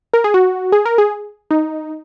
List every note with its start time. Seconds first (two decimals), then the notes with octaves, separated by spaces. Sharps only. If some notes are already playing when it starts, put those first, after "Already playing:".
0.13 A#4
0.24 G#4
0.34 F#4
0.72 G#4
0.86 A#4
0.98 G#4
1.51 D#4